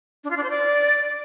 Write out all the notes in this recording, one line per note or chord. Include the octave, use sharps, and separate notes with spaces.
D4
F4
D4
C5
D5